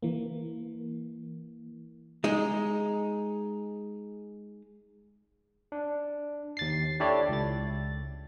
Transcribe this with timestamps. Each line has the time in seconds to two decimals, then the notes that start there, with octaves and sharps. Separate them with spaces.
0.02 E3 A#3
2.24 G#3 D#4
5.72 D4
6.57 D#2 A6 C7
7.00 D4 E4 G4 A4 C#5 D5
7.29 C#2 A6